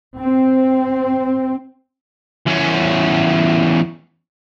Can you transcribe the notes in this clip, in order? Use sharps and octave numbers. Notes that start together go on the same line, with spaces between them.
C4
E2 C#4